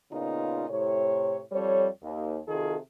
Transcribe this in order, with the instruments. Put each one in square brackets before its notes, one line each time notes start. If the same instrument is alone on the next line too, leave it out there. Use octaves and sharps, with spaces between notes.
[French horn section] A#2 C#3 B3 D#4 F4
A2 C3 C#5
F2 G3 A4 C#5
D#2
C3 D#3 F4 F#4 G#4 A4